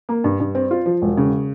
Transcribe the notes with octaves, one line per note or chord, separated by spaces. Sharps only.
A#3
G2
G2
C4
F4
F3
E1
C#3